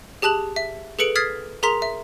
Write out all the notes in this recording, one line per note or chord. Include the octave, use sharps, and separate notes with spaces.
G4 G#4 A5 F#6 F#7
E5
G#4 A4 B4 C#7 D7 F#7
D#6 F6 G#6 A6 B6 C7
G#4 A#4 A#5 C6 B6 F7
E5